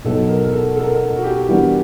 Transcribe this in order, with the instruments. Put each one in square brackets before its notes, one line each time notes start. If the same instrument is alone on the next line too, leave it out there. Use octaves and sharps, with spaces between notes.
[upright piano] B2 F#3 B3 D#4 [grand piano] A4
[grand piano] A#4
A#4
A4
A4
A#4
A4
F#4
G4
[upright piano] E3 G3 B3 D4